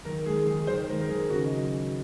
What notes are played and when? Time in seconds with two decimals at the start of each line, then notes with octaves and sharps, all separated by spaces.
0.05 D#3 A#4
0.26 G#3 G#4
0.46 D#3 G#4
0.67 D#3 C5
0.89 G#3 A#4
1.01 A#4
1.10 D#3 G#4
1.30 C#3 F#4
1.45 D#5
1.51 F#3